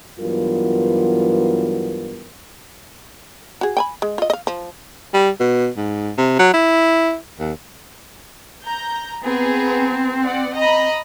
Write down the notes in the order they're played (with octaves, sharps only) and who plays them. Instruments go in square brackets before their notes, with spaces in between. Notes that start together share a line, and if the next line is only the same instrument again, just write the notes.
[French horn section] G2 E3 F#3 B3 F4 A#4
[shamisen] F#4 G#4
G5 G#5 B5
G#3
F4 D#5
D#5 F5
F3
[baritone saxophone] G3
B2
G#2
C3
F#3
E4
D#2
[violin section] A#5 G6
[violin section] B3 G#4 A#5 [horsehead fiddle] C4
[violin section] D5 F#5
D#5 A#5 B5